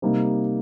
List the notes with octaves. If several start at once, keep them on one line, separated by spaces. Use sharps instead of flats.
C3 G3 A#3 D#4